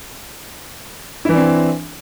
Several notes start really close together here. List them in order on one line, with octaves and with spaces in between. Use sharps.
E4 E3 D4 C4